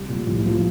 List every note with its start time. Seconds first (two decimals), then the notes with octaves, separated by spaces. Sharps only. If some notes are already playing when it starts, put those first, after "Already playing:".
Already playing: C2
0.09 A#2
0.15 F3
0.27 A2
0.44 F3 A#3